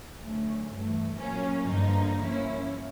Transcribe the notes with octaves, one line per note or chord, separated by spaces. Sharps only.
D2 D3 F#3 A3 C#4
G2 E3 A3
A#2 F#3 A#3 C#4
G2 D3 F3 A#3 D#4
F3 A#3 C#4 E4